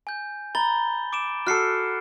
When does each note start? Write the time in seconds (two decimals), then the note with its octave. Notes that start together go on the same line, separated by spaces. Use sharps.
0.07 G#5 G6
0.55 A#5 B5 A6 G7
1.13 D6 D7 E7
1.47 F#4 A4 F6 C7 C#7